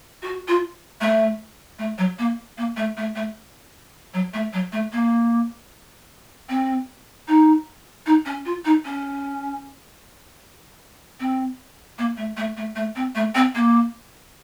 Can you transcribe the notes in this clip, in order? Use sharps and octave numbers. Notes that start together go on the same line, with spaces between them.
F#4
F4
A3
A3
F#3
A#3
A#3
A3
A3
A3
F#3
A3
F#3
A3
A#3
C4
D#4
D#4
C#4
F4
D#4
C#4
C4
A#3
A3
A3
A3
A3
C4
A3
C4
A#3